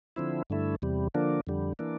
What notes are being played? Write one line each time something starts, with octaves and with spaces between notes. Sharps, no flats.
D3 F3 C4 E4
G2 D3 A3 E4
E2 C3 G3
D3 F3 A#3 D4
F2 D3 G3
E3 A#3 D4